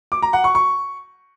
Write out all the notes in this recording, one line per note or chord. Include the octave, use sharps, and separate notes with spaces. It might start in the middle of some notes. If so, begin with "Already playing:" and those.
D6
A#5
F#5
C#6
C#6